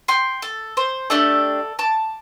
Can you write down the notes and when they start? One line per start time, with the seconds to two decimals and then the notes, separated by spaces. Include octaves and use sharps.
0.08 G5 C6
0.42 A4
0.77 C5
1.10 A3 D4 G4 A4 D5
1.79 A5 D6